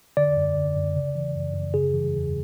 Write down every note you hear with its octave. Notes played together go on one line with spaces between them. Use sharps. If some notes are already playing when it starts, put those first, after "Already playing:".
D3 D5
F#2
D3
F#2
C#3
E3
F#2
F#2
C#3 G#4
E3
E2